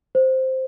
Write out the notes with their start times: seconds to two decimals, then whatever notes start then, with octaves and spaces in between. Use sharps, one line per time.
0.15 C5